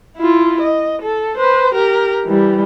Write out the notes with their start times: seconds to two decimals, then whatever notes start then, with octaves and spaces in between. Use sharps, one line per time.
0.17 E4 F4
0.61 D#5
1.02 A4
1.37 B4 C5
1.74 G4 A#4
2.25 E3 G3